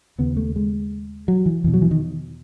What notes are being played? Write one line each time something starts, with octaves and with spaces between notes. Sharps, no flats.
D#2 C#3 B3
A3
G#3
F#3
E3
E2 B2 E3
F#3
E3
D#3